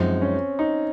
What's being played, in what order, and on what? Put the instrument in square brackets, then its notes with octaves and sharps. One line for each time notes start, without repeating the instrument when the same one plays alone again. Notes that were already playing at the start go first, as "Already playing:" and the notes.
Already playing: [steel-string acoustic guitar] F#2 F3 G#3 D#4 F#4 [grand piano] C4
[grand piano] C#4
D#4